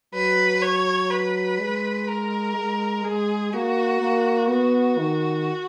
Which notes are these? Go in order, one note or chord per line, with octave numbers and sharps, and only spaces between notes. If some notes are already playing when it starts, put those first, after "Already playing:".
F#3 B4
C#5
B4
G#3
A#4
G#3
G#3 G#4
A#3 F#4
A#3
B3 F#4
D#3